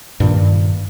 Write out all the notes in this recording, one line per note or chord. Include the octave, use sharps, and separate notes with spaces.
G2 A#2 D#3